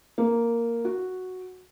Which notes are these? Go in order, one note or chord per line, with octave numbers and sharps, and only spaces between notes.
A#3
F#4